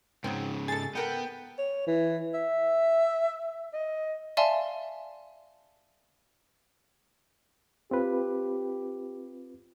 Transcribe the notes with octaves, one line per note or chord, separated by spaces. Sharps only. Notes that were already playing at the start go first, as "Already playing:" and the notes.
G#2 C#3 F#3 B3 C4
G#4 A4 A6
B3 A4 A#4 F#5 G5
C#5
E3
E5
D#5
D5 E5 F5 G#5 A5 C6
C4 F4 G4 B4